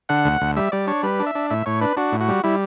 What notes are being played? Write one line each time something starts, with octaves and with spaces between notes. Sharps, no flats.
D3 F#5
D2
D2
G3 E5
G3 D5
D4 C#5
G3 B4
D4
E5
D4
A2 E5
A2 C#5
D4 B4
D4 F#4
A2
F#4
G3
G3 E4